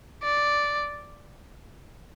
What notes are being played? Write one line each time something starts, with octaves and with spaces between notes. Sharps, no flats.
D5